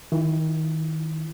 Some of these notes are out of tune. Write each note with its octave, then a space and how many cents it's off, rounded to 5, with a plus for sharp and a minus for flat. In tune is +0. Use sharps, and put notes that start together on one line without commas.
D#3 +25 E4 +30